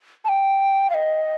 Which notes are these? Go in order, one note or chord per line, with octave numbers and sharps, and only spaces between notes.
A5
G5
F5
D#5